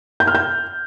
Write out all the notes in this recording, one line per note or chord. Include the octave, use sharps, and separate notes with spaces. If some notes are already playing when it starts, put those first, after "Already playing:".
G6
F6
G6